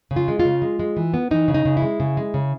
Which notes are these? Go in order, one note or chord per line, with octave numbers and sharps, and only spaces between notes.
C#3
F4
G#3
F4
C#3
G#3
G#3
E3
B3
E3 D#4
C#3
D#4
C#3
E4
G#3
C#3
G#3
C#3